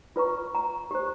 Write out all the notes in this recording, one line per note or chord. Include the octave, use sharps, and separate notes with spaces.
F4 B4 A#5 C#6
A#5
G4 C5